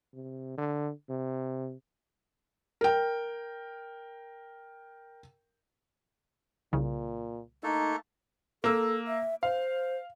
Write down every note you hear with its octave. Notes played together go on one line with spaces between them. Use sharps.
C3
D3
C3
A#4 G5
C2 A#2 C#3
A3 A#3 D#4 A4
A#3 A4 E6
E5
C5 F5